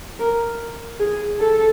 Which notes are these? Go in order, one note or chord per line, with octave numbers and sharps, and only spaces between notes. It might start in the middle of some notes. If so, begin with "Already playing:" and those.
A#4
G#4
A4